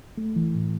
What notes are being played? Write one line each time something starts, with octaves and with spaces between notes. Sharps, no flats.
A3
E3
A2